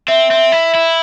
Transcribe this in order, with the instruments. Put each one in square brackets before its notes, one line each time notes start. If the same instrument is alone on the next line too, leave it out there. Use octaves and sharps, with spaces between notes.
[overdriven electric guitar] C4 [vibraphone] E5
[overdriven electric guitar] C4
E4
E4